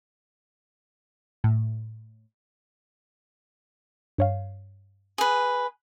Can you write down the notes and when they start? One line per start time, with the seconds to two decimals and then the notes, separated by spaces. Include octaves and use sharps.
1.44 A2
4.18 G2 C#5 F5
5.18 G#4 B4